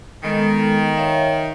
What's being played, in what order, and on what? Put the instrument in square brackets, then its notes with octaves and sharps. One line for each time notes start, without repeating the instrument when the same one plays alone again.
[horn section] D#3 [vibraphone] G#3 B3 A4
[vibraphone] C#5 E5 F5